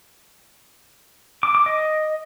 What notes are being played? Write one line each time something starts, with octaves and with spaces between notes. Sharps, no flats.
D6
D6
D#5